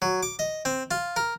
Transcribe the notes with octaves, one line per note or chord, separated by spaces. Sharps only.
F#3
D6
D#5
C4
F4
A#4